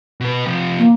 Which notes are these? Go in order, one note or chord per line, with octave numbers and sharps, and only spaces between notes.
B2 B4
C3 F3
A#3